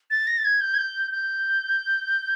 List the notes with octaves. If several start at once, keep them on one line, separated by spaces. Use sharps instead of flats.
A6
A#6
A6
G#6
G6
G#6
G6
G6